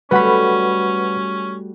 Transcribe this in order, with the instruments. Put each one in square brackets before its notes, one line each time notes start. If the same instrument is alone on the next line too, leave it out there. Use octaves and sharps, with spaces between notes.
[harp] G3 A3 F#4 [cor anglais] C#4 [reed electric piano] B4 F#5 B5